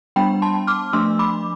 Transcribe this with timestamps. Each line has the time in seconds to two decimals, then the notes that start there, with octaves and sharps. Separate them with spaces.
0.16 G3 B3 D4 G5 B5
0.42 A5 C6
0.67 D6 F6
0.93 F3 A3 D4 C6 E6
1.19 B5 D6